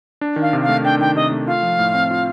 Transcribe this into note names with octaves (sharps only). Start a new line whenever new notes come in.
D4
D#3
F5
C3
F5
A3
D4 G5
D#3 G5
C3 D#5
A3
F4 F5
F3
A2
C4
F4